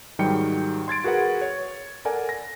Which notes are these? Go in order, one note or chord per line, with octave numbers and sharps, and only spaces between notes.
G#2 D#3 F#3 G3 G5 C#7
C6 G#6 A6 D7
F#4 G#4 A#4 B4 F#5
C#5
A4 A#4 D5 F#5 G#5
A#6